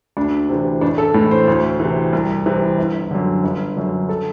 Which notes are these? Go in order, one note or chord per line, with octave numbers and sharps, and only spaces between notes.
D2 D4
C3 E3
A1 D4
A4
A2 E3
C5
D2
C3 E3
C2
C3 E3
G1
F#2 D3
G1
F#2 D3
A4